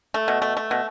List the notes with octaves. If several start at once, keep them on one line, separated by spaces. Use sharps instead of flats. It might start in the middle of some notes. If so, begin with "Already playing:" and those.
A3
B2
A3
A3
B2